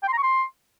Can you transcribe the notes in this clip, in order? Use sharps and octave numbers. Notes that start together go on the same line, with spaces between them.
G5
C6
A#5
C#6
C6